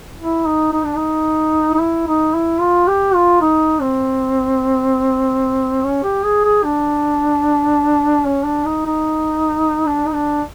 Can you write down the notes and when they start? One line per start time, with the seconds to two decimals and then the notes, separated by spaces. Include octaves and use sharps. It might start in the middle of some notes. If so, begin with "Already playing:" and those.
0.19 E4
0.46 D#4
0.73 D#4
0.85 D4
0.96 D#4
1.74 D#4
1.80 E4
2.07 D#4
2.34 E4
2.61 F4
2.88 G4
3.15 F4
3.42 D#4
3.81 C4
5.84 C#4
6.03 G4
6.23 G#4
6.44 G#4
6.64 D4
8.25 C#4
8.45 D4
8.65 D#4
8.86 D#4
9.86 D4
10.06 D#4
10.14 D4